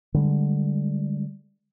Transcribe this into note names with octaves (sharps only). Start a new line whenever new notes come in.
D3 G3 G#3